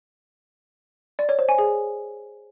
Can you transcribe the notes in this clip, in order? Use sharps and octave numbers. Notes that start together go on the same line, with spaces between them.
D5
C#5
C5
G#5
G#4